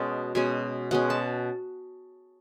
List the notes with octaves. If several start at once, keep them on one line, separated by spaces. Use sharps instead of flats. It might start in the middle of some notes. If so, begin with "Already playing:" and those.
Already playing: B2 G#3 C#4 A5
B2 G#3 C#4 G#5
B2 G#3 C#4 F#5
A5